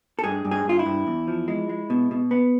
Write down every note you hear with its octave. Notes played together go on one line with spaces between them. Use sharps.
A4
G2 G#4
G2
G#4
G2 F4
E4
G2
E2
F3
G#3
G#3
B2
B2
B3